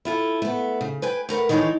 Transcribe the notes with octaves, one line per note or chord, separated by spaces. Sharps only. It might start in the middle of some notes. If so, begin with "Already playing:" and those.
E4 F4 A4
A3 B3
C#3
B4 G5 G#5
A3 A#4 B4 F#5
D#3 E3 G#3 D#4 A4 C#5